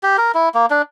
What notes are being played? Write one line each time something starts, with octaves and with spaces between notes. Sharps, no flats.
G4
A#4
E4
A#3
D4